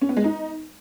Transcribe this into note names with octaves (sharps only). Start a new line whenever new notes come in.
C#4
B3
G#3
D#4